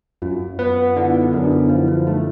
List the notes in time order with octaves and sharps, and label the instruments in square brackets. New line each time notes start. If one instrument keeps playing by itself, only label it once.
[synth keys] F#2 [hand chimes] F4
[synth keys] B3 [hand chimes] F4
[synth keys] D3 [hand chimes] E4
[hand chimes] D#4
[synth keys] F#2 [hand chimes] D4
[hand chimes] E4
[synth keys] F3 [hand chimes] E4
[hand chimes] F4
[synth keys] A3 [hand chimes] D#4